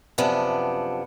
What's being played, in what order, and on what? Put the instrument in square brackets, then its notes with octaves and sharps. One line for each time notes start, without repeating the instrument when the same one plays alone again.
[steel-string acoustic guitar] F#2 C3 F3 B3 D4